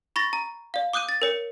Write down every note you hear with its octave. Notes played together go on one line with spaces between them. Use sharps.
B5 C#6 A6 A#6
A#5
D5 F5
D6 D#6 F#6 G6 D#7
A6
A#4 C#5 C#7